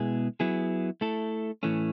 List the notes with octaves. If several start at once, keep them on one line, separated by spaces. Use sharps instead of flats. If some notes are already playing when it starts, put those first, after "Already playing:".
Already playing: B2 G#3 B3 E4 G#4
F#3 B3 E4 G#4
A3 E4 A4
A2 E3 A3 C#4